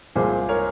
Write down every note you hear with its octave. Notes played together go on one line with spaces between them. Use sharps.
C2 A#2 F3 G#3 G#4 C5
A#4 C#5